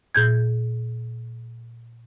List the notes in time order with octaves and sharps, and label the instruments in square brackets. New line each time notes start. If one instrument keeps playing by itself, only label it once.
[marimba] A#2 G6 G#6